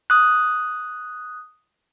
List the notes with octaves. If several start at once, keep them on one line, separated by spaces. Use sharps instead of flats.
D#6 F#6